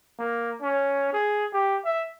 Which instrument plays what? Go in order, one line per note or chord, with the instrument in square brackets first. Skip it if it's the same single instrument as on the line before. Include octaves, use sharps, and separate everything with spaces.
[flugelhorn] A#3
C#4
G#4
G4
E5